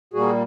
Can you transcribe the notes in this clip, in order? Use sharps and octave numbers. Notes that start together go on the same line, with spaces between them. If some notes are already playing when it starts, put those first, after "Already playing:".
A#2 G3 A#3 F#4 G#4